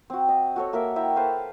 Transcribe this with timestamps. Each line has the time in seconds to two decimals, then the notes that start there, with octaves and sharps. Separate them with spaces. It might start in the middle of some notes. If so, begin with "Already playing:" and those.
0.10 C4 F#4
0.28 D#5
0.56 F#4 A4 C#5
0.73 A#3 A#4 E5
0.96 E4 E5 G5 A#5
1.16 A4 B4 C5 F5